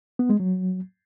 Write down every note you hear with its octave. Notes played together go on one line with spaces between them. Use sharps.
B3
G#3
F#3